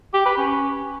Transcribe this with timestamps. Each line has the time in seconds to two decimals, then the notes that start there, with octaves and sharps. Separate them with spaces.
0.14 G4
0.26 B4
0.38 C#4